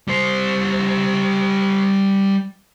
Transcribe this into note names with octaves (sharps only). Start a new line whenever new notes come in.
G3 C5